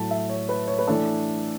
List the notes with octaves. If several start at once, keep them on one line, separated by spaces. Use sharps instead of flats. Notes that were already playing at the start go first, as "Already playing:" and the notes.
Already playing: A2 F#3 A3 A5
E5
C#5
B4
C#5
B4
E3 A3 D4 A4